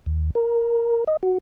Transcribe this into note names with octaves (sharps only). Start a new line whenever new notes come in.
D#2
A#4
D#5
F#4